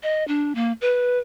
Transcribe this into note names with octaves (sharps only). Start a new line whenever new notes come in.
D#5
D4
A#3
B4